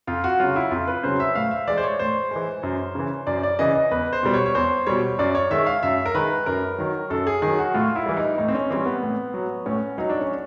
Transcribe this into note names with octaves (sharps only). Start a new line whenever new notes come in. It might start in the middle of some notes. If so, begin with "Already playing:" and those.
F2 F4
F#4
C#3 F#3 F4
E4
F2 F4
B4
C#3 F#3 C5
E5
A2 F5
E5
E3 G#3 D5
C5
C#5
A2 C5
E3 G#3
F#2
C#3 E3
F#2 D5
D5
C#3 E3 D#5
D#5
E2 B4
C5
B2 G3
C#5
C#5
E2 C5
B2 G3 C#5
F#2 D5
C#5
D#3 G#3 E5
F5
F#2 E5
A#4
D#3 G#3 B4
F#2 A#4
D#3 F#3
F#2 A4
G#4
D#3 F#3 G#4
F#4
A2 F4
E4
E3 G3
D#4
A2 D#4
C4
C#4
E3 G3 C4
B3
A2
F#3
A2 C#4
F#3 D#4
D4
C#4